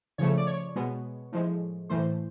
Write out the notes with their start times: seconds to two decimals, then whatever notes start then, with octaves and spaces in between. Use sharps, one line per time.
0.18 C#3 F3 A3 C#5
0.37 D5
0.47 C#5
0.76 B2 G#3 B3
1.32 A2 F3 G#3
1.89 A2 E3 A3 C5